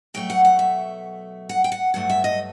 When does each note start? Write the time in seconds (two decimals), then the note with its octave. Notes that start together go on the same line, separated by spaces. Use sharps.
0.14 B2 F#3 A3 G5
0.30 F#5
0.45 F#5
0.59 E5
1.49 F#5
1.64 G5
1.72 F#5
1.94 G2 F#3 A3 F#5
2.10 E5
2.24 D#5